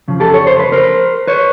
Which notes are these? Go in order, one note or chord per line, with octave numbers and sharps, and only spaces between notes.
F2 C#3 F3
G4 A4
C#5
C5
B4
A#4 C5
B4 C#5